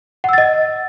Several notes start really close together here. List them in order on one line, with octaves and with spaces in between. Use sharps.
F#5 E6 A6 D#5